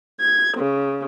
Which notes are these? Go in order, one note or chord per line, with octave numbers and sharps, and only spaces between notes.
G#6
C#3